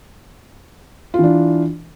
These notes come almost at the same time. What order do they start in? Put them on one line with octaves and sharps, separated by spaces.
F4 E3 D4